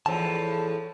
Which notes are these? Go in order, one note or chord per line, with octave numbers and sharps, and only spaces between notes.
E2 A2 F3 A5